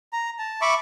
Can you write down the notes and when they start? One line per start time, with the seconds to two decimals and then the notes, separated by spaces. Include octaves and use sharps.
0.13 A#5
0.39 A5
0.61 E5 B5 C#6 D6